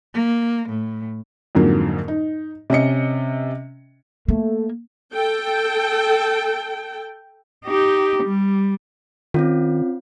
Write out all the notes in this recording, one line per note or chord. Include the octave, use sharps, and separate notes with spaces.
A#3
A2
F2 G#2 D3 F#3 A#3
D#4
C3 C#4 D#5 C#7
A3 A#3
A4 G5
D#4 G4
G3
D#3 C4 C#4 F4